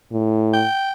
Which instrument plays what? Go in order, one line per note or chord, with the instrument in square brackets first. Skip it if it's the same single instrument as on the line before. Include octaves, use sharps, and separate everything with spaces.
[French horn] A2
[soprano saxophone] G5